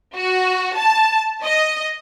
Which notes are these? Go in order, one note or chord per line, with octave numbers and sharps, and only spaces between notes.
F#4
A5
D#5